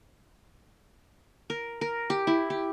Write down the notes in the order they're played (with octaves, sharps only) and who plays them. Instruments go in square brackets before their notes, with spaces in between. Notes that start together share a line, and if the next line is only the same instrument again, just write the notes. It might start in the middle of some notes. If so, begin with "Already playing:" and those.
[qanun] A#4
A#4
G4
E4
G4